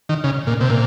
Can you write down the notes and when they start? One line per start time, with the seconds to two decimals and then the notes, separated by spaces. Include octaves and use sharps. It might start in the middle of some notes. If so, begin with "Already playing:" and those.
0.09 D#3
0.24 C#3
0.47 A#2
0.61 C3
0.70 A#2